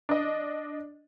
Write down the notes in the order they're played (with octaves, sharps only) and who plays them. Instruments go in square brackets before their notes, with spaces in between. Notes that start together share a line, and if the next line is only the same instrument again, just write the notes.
[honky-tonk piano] D4 D#5